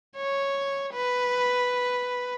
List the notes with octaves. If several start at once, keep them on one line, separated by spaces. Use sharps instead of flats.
C#5
B4